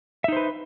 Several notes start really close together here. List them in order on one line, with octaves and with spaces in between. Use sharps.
E5 D#4 C5 B4